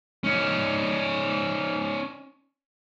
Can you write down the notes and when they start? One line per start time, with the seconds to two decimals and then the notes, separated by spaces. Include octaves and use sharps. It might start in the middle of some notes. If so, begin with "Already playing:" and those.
0.24 C#4 D#4